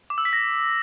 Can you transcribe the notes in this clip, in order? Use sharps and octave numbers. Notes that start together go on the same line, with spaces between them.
D6
E6
B6
A#6